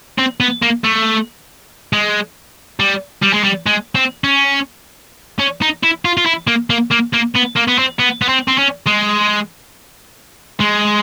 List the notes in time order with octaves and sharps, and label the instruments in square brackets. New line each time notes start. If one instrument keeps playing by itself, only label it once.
[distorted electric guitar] C4
B3
A#3
A3
G#3
G3
G3
G#3
G3
G#3
C4
C#4
C#4
D#4
E4
F4
F4
E4
A#3
A#3
A#3
A#3
B3
A#3
B3
C4
B3
B3
C4
C4
C#4
G#3
G#3